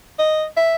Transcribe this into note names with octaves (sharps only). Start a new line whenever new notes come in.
D#5
E5